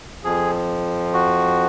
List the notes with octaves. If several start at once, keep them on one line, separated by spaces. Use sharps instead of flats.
F2 F3 G#4
F#4